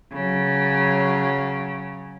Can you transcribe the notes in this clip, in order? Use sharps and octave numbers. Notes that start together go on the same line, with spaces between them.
C#3 F#3